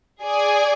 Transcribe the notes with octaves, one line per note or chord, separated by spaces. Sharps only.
G#4 D5 G#5